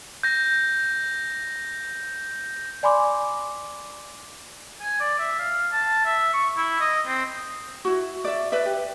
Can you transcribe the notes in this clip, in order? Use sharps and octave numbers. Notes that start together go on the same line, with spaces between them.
G6 A#6
D5 G#5 B5 C6 D6
G#5
D5
E5
F5
A5
E5
C#6
E4
D#5
C4
E4 F#4
D5 E5
B4 D5 E5
G4